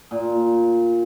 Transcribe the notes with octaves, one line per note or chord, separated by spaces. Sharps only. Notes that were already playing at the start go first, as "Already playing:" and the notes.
A#2